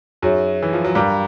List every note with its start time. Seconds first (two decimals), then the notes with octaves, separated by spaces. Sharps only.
0.22 F#2 F#3 D#4 G#4 C#5 E5
0.63 E3
0.73 F3
0.85 F#3
0.95 G2 G3 A#4 D5 F5 A#5 D6